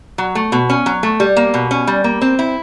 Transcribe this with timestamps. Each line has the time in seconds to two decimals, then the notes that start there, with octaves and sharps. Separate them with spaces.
0.18 F#3
0.35 A3
0.52 B2
0.70 C#4
0.86 F#3
1.03 A3
1.20 G3
1.37 A#3
1.54 B2
1.71 C#4
1.87 G3
2.04 A#3
2.21 C4
2.39 E4